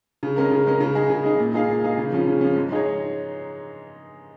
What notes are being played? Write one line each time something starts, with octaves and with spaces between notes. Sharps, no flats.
C#3
G#3 C#4 A#4
C#3
G#3 C#4 A#4
C#3
G#3 D#4 G#4
C#3
G#3 D#4 G#4
A#2
G#3 D#4 G#4 F5
A#2
G#3 D#4 G#4 F5
C#3
F3 C#4
C#3
F3 C#4
G#2
G#3 D#4 G#4 C#5